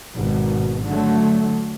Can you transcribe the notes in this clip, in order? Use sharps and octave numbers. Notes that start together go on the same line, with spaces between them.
G#1 B2
D3 F#3 A3